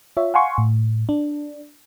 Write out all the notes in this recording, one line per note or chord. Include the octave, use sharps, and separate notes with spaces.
F4 C#5 E5
F5 F#5 G#5 C6 C#6
A2
D4